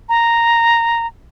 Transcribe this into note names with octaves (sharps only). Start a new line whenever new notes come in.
A#5